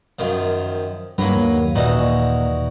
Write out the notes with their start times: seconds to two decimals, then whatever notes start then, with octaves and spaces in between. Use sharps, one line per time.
0.19 F#2 D#3 F3
1.18 G2 F#3 A#3 B4
1.35 D#2
1.75 A#2 E3 D#4 F#4